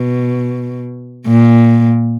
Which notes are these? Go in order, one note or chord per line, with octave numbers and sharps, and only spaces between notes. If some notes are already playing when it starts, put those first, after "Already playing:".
Already playing: B2
A#2